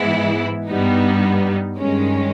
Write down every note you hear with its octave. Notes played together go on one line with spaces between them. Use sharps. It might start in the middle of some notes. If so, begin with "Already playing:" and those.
Already playing: G#2 E3 G#3 B3 E4
G2 G3 B3 D#4
G2 D#3 G#3 C#4